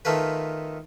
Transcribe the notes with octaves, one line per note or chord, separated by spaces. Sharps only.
D#3 A3 F4 B4